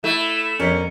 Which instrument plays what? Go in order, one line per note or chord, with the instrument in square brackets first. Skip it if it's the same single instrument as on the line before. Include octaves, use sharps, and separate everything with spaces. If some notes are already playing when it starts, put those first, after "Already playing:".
[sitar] A3 [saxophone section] E4 [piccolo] E7
[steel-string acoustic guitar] F2 A#4 [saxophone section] B2 G3 C#4 [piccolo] C#7